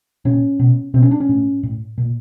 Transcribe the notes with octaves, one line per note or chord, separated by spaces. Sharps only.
A#2 C#4
B2
B2 C4
C#4
D4
C#4
A2
A2
A#2